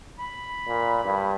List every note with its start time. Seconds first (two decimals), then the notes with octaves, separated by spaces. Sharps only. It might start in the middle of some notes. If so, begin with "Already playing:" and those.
0.19 B5
0.68 A#2
1.04 G2